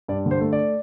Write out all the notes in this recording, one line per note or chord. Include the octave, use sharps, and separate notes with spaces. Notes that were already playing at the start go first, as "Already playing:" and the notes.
G2 D5
D3 C5
A3
D5